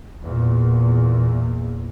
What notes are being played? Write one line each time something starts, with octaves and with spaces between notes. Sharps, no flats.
E2 A#2